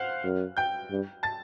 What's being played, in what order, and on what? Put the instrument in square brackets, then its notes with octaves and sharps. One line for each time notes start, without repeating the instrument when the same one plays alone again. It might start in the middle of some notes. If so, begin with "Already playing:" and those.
Already playing: [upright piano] C5 F5 F#5 F6 F#6
[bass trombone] F#2
[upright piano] G5 G6
[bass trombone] G2
[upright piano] A5 A6